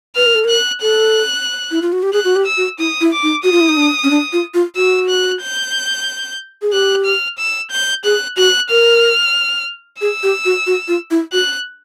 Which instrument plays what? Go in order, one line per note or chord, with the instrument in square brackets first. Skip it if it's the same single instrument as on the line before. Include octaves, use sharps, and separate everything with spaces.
[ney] B4 [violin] F6
[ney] A#4
A4
[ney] A#4 [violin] F#6
[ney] A4 [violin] F#6
[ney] E4
F4
F#4
G4
[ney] G#4 [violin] F#6
[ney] F#4
G4
[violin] E6
[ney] F#4
[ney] E4 [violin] D#6
[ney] E4
[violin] D6
[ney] D#4
[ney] F#4 [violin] D#6
[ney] F4
E4
D#4
D4
C#4
D4
F4
F4
[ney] F#4 [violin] E6
[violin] F#6
G6
[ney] G#4
[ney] G4 [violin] F#6
[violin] F6
E6
G6
[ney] G#4 [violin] F#6
[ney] F#4 [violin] F#6
[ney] A#4 [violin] F6
[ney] G#4 [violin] E6
[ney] G4
F#4
F#4
F4
E4
[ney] F#4 [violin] F#6